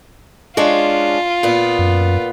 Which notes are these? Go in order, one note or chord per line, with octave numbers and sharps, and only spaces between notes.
G#3 C#4 D4 F4
A#2 B3
F#2